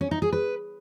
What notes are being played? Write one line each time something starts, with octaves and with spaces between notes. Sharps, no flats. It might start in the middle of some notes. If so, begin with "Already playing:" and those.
C#4
D#4
G#4
B4